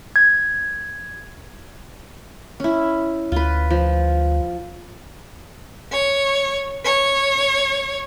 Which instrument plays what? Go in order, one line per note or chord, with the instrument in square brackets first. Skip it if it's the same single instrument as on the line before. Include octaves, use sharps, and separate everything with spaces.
[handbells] G#6
[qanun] C#4 E4
[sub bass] D2 [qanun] F4 B4
[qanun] F3
[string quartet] C#5
C#5